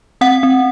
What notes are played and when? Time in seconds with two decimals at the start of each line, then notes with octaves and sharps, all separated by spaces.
0.21 C4 F#5
0.43 C4